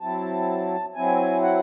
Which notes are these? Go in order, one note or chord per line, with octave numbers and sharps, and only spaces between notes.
F#3 C4 E4 A5
F#3 C4 E4 G#5
F#5